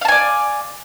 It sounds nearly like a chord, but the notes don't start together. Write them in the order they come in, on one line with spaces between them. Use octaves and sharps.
F5 A5 G#5 D5